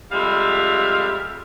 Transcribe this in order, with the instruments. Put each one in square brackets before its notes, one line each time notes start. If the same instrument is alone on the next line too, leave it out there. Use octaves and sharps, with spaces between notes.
[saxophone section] F2 G3 G#3 E5 F5